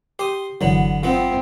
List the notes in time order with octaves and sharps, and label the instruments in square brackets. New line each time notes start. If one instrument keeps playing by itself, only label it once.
[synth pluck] G4 [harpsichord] C5 D#6
[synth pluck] G1 E3 F#3 [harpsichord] D3 B3
[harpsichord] F3 B3 [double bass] C4